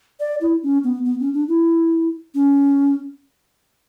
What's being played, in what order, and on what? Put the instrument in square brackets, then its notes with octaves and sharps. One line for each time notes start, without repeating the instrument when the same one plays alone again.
[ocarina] D5
E4
C#4
B3
B3
C#4
D4
E4
C#4